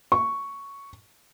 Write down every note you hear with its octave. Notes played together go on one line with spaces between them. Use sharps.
C#6